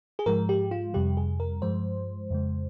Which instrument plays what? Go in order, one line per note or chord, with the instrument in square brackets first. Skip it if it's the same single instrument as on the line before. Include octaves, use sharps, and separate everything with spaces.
[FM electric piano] G#4
G#2 F3 G#3 A#4
G4
F4
F2 C3 G3 G4
G#4
A#4
G2 F3 G#3 C5
F2 C#3 G#3